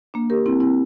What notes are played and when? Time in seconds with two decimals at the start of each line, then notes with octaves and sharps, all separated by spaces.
0.14 A#3 D4
0.30 G4 A#4
0.46 C4 E4
0.60 C4 E4